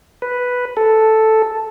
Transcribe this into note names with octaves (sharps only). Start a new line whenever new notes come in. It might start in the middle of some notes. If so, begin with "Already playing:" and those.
B4
A4